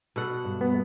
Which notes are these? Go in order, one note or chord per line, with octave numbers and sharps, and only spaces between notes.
B2 A4 F#5
G2
B3